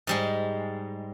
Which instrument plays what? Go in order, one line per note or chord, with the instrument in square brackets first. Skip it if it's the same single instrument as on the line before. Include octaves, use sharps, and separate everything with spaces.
[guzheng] G#2 G3 G#3